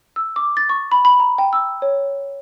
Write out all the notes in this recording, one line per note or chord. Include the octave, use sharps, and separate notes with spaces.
E6
D6
A6
C#6
B5
B5
A#5
G5
E6
C#5